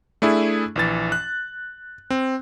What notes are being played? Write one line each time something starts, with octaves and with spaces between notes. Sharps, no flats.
A3 D4 E4 G#4
A#1 E3 A6
F#6
C4